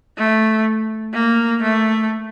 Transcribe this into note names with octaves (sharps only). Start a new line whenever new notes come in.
A3
A#3
A3